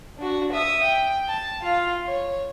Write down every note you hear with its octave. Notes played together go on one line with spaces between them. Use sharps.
D4 F#4
E5 D#6
G5
A5
F4 F5
C#5